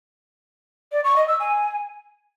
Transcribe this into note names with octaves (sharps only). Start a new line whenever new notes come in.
D5
C#6
D#5
E6
G#5